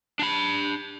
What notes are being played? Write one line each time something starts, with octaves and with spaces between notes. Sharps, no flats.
D4 B5